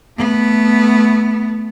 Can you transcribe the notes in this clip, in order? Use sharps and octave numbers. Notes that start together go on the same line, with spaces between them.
A3 B3